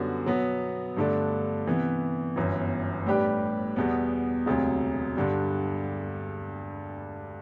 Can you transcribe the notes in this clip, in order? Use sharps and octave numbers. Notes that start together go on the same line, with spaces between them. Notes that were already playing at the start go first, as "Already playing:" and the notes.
Already playing: F#2 D3 G3 B3 F#4
B2 F#3 B3
G2 D3 A3 D4
C3 E3 B3
G1 F#2 E3
A2 G3 D4 G4 B4
E2 B2 G3 B3
E1 D2 C3 F#3
G2 D3 G3